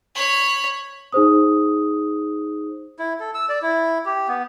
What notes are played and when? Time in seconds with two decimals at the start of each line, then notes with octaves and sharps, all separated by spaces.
0.15 C#5 B5
1.13 D#4 G#4 C5 D#6
2.98 E4
3.20 A4
3.35 E6
3.49 D5
3.62 E4
4.05 G4
4.28 B3